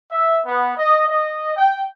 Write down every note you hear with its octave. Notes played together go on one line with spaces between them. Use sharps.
E5
B3
D#5
D#5
G5